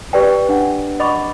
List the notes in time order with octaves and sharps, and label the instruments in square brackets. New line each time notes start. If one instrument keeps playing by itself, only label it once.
[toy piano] G4 B4 D5 G5
D4 F#5
D#5 F#5 B5 C#6 D6